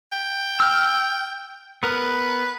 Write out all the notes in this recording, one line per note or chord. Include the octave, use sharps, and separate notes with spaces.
G5
E6 F6
B3 A#4 B4